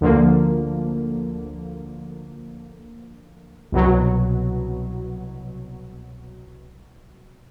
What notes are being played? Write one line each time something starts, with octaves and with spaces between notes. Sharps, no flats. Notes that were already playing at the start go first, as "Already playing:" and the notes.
D2 D3 F3 A#3
C2 B2 F#3